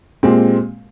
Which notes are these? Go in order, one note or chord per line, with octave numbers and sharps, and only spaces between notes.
A#2 G#3 C4 G4